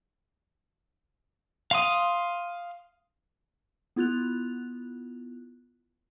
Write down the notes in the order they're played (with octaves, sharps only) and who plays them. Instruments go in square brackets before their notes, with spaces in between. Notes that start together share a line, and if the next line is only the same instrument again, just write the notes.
[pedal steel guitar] F5 C6 D#6
[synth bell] B3 E4 F4 F#6 F7